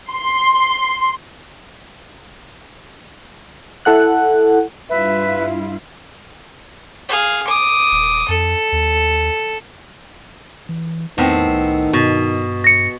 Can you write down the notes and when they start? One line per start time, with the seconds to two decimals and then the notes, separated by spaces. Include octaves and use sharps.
0.11 C6
3.85 E4 A4 F#5 F#6
4.89 G2 E4 F4 B4 E5
7.09 G#4 F5
7.47 D6 D#6
7.92 D#1
8.28 F2 A4
8.72 D#2
10.69 E3
11.18 E2 A2 D#3 B3 C4
11.48 C2
11.93 G2 B2
12.64 A#6 C#7